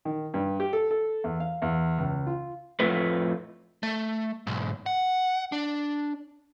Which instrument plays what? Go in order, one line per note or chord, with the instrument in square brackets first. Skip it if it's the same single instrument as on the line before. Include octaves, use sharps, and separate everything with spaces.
[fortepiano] D#3
G2
G4
A4
A4
E2
F5
E2
C#2
F4
[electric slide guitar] F2 A2 A3 F4 B4
[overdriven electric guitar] A3
B1 G#2
F#5
D4